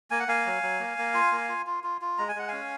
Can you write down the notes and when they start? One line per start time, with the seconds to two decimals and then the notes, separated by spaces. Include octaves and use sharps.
0.11 A#3 G#5
0.20 F#5
0.28 A#3 F5 G#5
0.46 F#3
0.63 F#3
0.80 A#3
0.98 A#3
1.14 F4
1.31 A#3
1.49 F4
1.67 F4
1.84 F4
2.01 F4
2.18 G#3 A#5
2.29 G#5
2.36 G#3 F#5
2.48 C#4 F5 G#5